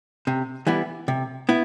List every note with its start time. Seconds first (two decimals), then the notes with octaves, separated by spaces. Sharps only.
0.27 C3
0.67 E3 G3 B3 E4
1.08 C3
1.49 B3 E4